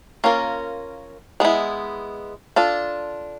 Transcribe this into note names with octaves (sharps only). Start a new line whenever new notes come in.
A#3 C#4 F4 A#4
G#3 B3 E4
D4 F4 A4